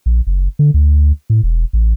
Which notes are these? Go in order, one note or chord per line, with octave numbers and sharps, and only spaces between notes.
A#1
F#1
D3
D2
A2
E1
A1